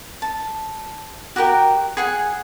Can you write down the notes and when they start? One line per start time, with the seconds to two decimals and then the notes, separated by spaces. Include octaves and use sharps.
0.22 A5
1.36 F#4 G4 A#4 G5
1.97 G#4 F#5 G#5